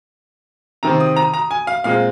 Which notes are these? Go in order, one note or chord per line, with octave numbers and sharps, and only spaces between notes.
C3 D#3 C4 A#5
D#6
A#5
A#5
G#5
F5
A#2 G#3 C4 F5